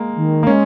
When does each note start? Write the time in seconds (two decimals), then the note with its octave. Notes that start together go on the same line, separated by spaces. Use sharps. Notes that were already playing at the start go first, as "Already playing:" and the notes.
Already playing: G#3 A#3
0.16 D#3
0.43 A#3
0.47 G#3 C#4